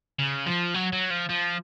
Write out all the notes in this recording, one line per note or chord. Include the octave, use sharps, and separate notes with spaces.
C#3
F3
F#3
F#3
F3
F3